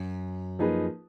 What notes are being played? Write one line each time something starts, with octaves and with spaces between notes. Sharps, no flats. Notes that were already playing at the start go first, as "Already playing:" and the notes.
Already playing: F#2
F3 A#3 D#4 G#4 B4